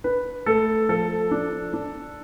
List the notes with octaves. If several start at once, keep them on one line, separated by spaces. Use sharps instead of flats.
D4 B4
A3 A4
F3 A4
D4
D4